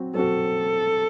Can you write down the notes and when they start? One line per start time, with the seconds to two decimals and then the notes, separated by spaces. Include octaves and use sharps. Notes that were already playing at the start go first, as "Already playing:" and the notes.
Already playing: F#3 C4 F#4
0.15 F#3 C4 F#4 A4